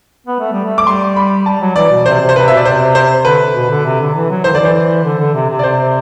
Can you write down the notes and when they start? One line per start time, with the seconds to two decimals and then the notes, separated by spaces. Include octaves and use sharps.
0.27 B3
0.40 A3
0.52 G3
0.65 A3
0.78 D6
0.86 G3 C6
1.16 B5
1.46 G3 A5
1.61 F#3
1.76 E3 D5
1.91 B2
2.06 C3 C5
2.21 C3
2.29 C5
2.36 C3 B4
2.48 B2 E5
2.57 D5
2.65 C3 C5
2.95 C5
3.25 D3 B4
3.55 B2
3.70 D3
3.85 C3
4.00 D3
4.15 E3
4.30 F#3
4.44 E3 C5
4.52 D3
4.55 E3 D5
4.65 C5
5.04 D3
5.19 D3
5.34 C3
5.50 C3
5.59 D5
5.64 C3 C5